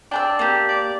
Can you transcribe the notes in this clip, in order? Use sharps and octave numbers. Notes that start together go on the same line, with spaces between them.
D4 G5 A5 E6
A#3 G4
D5